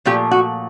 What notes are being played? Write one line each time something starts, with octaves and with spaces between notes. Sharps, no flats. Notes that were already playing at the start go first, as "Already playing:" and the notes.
A#2 F3 A3 G4
F#4